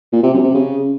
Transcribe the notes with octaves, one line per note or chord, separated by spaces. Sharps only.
A#2
C3
F#2
C3
C#3